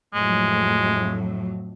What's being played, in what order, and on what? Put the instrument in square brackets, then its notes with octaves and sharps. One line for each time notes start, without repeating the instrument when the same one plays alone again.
[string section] F2 A2 F#3 [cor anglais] G#3